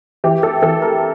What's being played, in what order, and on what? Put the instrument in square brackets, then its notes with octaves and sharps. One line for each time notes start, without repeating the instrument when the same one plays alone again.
[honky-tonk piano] E3 G4
A4
E3 A4
A#4